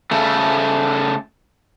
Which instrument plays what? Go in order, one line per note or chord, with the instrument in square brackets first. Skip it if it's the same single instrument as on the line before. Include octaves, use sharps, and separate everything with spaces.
[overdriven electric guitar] C#3 A3